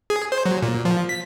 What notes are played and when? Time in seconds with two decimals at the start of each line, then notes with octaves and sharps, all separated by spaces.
0.10 G#4
0.32 C5
0.46 F#3
0.62 A#2
0.85 F3
1.09 B6